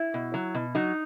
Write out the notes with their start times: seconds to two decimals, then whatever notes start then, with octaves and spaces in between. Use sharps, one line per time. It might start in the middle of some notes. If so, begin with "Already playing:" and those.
Already playing: E4
0.14 B2
0.34 F#3
0.54 B2
0.75 F#3 D#4